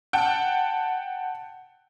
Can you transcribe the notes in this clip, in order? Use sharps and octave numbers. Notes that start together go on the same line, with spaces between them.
F#5 G5 A5